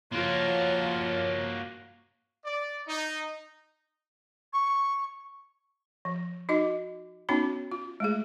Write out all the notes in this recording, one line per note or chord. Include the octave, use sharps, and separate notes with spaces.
F3 A#3 F4 F#4 C#5
D5
D#4
C#6
F3
D#4 F#4 D#5
B3 C#4 D#4 F#4 C#5 B5
F4
G#3 A3 G#4